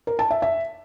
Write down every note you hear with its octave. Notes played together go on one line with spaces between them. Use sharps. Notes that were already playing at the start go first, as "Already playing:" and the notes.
A#4
A5
E5
E5